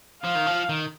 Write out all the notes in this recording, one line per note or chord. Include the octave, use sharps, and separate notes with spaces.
F3 F5
D#3
F3
D#3